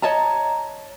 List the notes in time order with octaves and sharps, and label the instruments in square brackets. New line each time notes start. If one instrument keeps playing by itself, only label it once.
[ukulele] C#5 D#5 A5 A#5